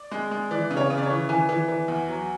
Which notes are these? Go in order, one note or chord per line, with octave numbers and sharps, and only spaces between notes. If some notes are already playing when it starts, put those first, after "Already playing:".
Already playing: D5
G#3
G#3
E3 D5
C#3
C#5
C#3
D5
C#5
E3
E3 G#5
E3
E3
E2
F#3